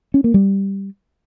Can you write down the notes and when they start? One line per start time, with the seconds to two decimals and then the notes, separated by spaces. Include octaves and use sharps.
0.14 C#4
0.24 A#3
0.34 G3